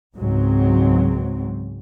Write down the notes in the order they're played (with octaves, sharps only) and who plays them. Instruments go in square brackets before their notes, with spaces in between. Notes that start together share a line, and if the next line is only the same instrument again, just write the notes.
[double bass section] C#2 G#2 F#3 C4